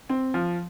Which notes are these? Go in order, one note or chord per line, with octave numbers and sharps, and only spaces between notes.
C4
F3